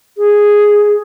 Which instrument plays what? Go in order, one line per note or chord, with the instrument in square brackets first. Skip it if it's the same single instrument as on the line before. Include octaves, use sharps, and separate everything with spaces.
[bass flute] G#4